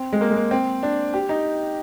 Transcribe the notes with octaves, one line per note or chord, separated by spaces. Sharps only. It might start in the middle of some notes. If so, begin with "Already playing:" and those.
Already playing: C4
G#3
A#3
G#3
A#3
C4
D4
G4
D#4